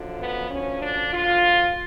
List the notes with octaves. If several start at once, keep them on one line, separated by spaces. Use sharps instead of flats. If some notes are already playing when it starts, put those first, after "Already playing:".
Already playing: F#2 D3 F3
B3
D2 D3 F3 C#4
D4
D2 D3 F3 F4